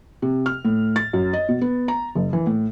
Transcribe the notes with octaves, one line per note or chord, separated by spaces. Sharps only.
C3
F6
A2
A6
F#2
D#5
B2
B3
A#5
F#1
E3
A2